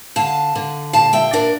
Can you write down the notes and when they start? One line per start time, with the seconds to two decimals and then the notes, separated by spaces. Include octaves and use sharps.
0.16 D3 F5 A5
0.55 D3
0.93 A#2 F5 A5
1.13 E5 G5
1.33 D4 A#4 D5